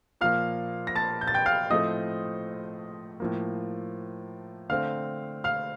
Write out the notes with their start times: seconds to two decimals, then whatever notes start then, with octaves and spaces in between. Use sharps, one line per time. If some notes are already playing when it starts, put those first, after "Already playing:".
0.21 A#2 F3 A#3 F5 F6
0.87 A#6
0.95 A5 A6
1.21 G6
1.27 A6
1.34 G5 G6
1.46 F5 F6
1.70 A2 F3 A3 C4 D#5 D#6
3.20 A2 F3 A#3
4.69 D3 A3 C4 F5 F6
5.44 F5 F6